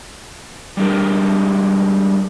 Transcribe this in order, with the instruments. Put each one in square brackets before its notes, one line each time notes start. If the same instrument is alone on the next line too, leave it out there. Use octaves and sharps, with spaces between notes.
[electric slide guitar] G3 G#3 D4 G4 A#4